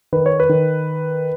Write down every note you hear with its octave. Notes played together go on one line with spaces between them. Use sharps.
D#3 B4
C#5
B4
D#3